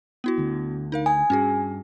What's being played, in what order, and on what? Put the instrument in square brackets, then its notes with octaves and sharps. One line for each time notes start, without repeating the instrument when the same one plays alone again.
[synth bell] B3 E4 F#4
[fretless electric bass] D2 D3
[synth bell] D#4 A#4 F5
[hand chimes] G#5 [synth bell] D#6
[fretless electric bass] G2 [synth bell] C#4 F#4 G#4